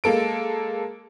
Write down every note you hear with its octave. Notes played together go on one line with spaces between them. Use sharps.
G#3 A#3 A4 D7